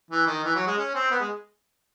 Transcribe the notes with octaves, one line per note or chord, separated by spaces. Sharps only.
E3
D#3
E3
F#3
G#3
C#4
C4
B3
G#3